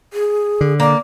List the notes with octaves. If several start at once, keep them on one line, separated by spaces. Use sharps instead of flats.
G#4
D3
A#3 D5